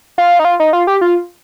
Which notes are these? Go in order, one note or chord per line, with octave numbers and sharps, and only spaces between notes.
F4
D#4
F4
D#4
F4
G4
F4